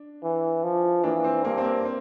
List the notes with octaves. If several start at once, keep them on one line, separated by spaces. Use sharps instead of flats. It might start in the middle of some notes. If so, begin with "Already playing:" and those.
Already playing: D4
E3
F3
E3 A#3 D4
C4
G2 A#3
C4
A#3
C4